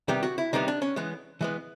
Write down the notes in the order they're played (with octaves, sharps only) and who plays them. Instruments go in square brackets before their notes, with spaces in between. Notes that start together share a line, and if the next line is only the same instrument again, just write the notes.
[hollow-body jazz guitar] C3 D#3 G3 B3 G4
F#4
E4
C3 D#3 G3 B3 D#4
D4
C#4
E3 G#3 B3
E3 G#3 B3